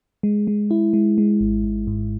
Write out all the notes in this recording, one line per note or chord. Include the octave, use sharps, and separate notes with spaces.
G#3
G#3
E4
G#3
G#3
G#1
G#1
G#2